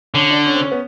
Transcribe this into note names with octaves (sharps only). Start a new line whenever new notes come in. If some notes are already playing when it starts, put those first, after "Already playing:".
D3 C#4
D4
C#4
C4
C#4
B3